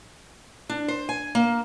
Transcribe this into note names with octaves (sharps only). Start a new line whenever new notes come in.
D4
C5
G#5
A#3